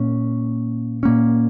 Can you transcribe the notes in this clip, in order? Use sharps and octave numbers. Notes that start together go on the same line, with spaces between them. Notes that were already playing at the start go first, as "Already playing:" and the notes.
Already playing: A#2 A#3 C#4
A#2 A#3 C#4